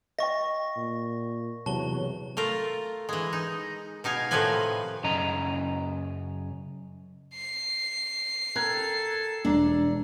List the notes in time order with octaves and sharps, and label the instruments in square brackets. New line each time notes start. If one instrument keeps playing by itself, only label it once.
[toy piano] D#5 G5 [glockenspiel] C#6 A#6
[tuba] A#2
[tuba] E2 [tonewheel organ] C3 F#3 [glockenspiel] A5 G7
[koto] A3 F4 A#4
E3 G#3
D#4
B2 D#4 F5 G#5
A2 C3 D#3 F3 B4 G#5
[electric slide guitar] F#2 C#3 D#5 A#5
[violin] C7
[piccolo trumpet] A4 [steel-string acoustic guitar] A#4 G5 [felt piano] A#5 F#6 G#6
[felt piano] E1 A#5 [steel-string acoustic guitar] D4